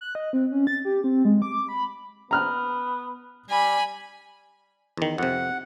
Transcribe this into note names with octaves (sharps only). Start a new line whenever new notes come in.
F#6
D#5
C4
C#4
A6
G4
C4
G#3
D6
B5
B3 A#5 F6 F#6
G3 G#5 B5
E2 D#3
F2 C3 F#5